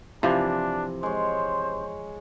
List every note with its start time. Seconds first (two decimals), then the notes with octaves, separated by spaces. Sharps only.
0.23 C3 E3 F3 D4
1.03 G#3 C5 C#5